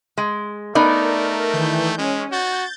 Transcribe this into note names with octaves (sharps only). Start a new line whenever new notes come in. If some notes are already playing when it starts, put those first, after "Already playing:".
G#3
A3 B3 D#4 A#4 D5
D#3 E3 G6
G#3 C#4
F#4 G6 A6